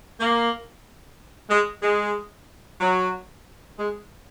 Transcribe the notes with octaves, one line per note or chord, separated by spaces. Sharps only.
A#3
G#3
G#3
F#3
G#3